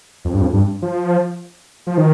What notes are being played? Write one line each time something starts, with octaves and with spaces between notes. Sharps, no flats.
F2
G2
F2
G2
F3
F3
D#3